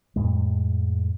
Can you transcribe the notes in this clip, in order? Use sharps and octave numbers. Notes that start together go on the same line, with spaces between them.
F2 A2 G#3